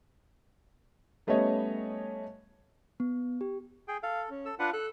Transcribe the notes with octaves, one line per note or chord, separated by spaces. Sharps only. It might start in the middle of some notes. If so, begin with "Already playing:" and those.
G3 A3 B3 C#4 C#5 D#5
B3
G4
G#4 G5
A4 F5
C#4
A4 E6
D4 F4 B4 F#5
A4 F#6